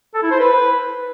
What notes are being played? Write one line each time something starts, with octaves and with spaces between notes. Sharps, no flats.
A4
E4
C5
B4